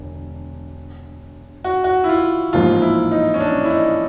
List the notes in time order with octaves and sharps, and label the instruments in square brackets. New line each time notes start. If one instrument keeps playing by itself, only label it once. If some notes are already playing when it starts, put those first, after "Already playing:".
Already playing: [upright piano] E1 D3
[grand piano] F#4
F#4
E4
F4
[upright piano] A1 G#2 F3 A#3 [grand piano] F4
[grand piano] E4
D#4
C#4
D4
E4
D#4